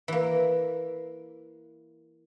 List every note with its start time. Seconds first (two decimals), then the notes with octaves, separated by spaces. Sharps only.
0.08 E3 A#3